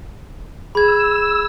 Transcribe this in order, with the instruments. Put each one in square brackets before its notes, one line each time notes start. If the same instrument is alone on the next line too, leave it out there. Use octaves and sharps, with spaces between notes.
[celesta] G#4 [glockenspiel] B5 G#6 [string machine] E6